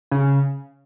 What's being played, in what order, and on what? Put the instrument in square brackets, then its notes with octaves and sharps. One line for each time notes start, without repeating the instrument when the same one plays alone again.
[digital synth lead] C#3